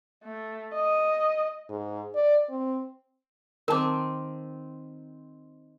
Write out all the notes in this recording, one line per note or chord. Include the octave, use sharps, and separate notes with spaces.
A3
D#5
G#2
D5
C4
D#3 C4 A#4 A5 D6